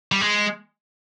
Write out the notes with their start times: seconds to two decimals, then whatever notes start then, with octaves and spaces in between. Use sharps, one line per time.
0.12 G3
0.21 G#3